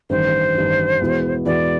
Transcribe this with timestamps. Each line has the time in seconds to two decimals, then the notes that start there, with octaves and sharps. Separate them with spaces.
0.10 A1 G2 D#3 C5
0.55 A1 G2 D#3
1.01 E2 B2 G#3 B3 E4
1.45 E2 B2 G#3 B3 E4 D5